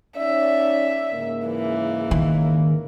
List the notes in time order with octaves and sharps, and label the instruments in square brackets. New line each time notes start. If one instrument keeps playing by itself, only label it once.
[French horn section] C#4 D#4 D5 [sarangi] E5
[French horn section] G#2 C#3 A#3
[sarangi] E3
[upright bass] D#3